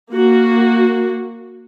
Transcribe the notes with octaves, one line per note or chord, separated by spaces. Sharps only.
A#3 F#4